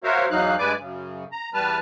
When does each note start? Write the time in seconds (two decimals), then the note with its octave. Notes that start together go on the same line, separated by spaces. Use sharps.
0.04 F#4 A#4 C5 C#5 E5 F5
0.30 E2 E3 F#3 D#4 F5 F#6
0.59 G2 G#3 B4 D5 G#5 D6
0.79 F#2 C#3
1.32 A#5
1.54 E2 G3 B4 A5 F6